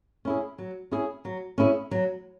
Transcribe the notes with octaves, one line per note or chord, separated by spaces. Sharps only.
C#4 E4 G#4
F#3
C#4 E4 G#4
F#3
C#4 E4 G#4
F#3